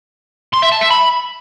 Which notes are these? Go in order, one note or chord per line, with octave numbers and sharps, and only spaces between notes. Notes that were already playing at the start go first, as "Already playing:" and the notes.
C6
E5
A5
E5
B5